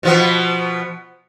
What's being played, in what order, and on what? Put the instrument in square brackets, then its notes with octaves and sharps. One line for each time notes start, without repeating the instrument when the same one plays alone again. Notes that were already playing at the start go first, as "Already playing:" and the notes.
[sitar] B2 F3 B3